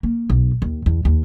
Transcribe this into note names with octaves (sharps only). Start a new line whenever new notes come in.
A#3
B1
D#2
E2
D#2